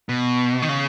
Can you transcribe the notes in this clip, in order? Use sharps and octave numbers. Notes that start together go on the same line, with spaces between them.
B2
D#3
C#3